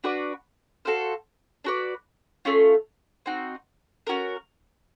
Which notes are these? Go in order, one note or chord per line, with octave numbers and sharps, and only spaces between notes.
D4 F#4 B4 D5
F#4 A4 C5 F5
D4 F#4 B4 D5
A3 C#4 F4
C4 D#4 F#4
C#4 F#4 A#4